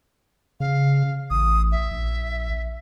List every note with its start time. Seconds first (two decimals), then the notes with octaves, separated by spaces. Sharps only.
0.60 C#3 F5
1.30 A1 D#6
1.72 E5
1.91 A#1